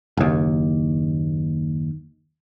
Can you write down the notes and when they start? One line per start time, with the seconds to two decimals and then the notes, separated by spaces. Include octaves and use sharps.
0.17 F#1 D#2